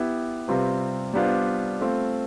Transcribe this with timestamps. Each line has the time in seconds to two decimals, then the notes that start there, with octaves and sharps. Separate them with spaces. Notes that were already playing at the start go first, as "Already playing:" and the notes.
Already playing: B3 E4 G4
0.48 C3 G3 C4 F4 B4
1.14 G3 B3 D4 F4 C5
1.81 A3 C4 F4